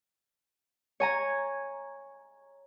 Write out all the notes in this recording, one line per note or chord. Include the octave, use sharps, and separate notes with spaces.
C#5 G#5 A#5